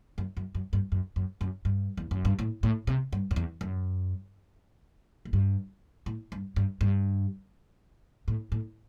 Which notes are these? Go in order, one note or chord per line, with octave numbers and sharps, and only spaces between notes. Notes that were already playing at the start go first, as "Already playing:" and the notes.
F#2
F#2
F#2
G2
F#2
F#2
F#2
G2
E2
F#2
G2
A2
A2
C3
G2
F#2
E2
F#2
A2
G2
A2
G2
G2
G2
A2
A2